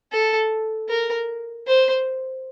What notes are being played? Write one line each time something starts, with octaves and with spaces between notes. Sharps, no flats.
A4
A#4
C5